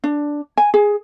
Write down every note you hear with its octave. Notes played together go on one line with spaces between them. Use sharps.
D4
G#5
G#4